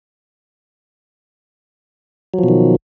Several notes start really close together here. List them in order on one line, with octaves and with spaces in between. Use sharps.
F#3 F3 B2 D#3